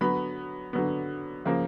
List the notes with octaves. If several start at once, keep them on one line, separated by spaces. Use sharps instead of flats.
D3 F#3 B3 B5
D3 F#3 B3
C#3 F3 A#3